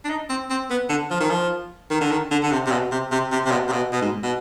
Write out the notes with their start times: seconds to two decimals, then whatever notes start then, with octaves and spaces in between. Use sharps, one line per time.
0.05 D4
0.10 D#4
0.29 C4
0.50 C4
0.70 B3
0.89 D3
1.10 F3
1.20 D#3
1.30 F3
1.90 D#3
2.01 D3
2.11 D#3
2.31 D3
2.43 D3
2.52 C3
2.66 C3
2.72 B2
2.91 C3
3.12 C3
3.32 C3
3.46 C3
3.51 B2
3.68 C3
3.73 B2
3.93 B2
4.02 G#2
4.23 B2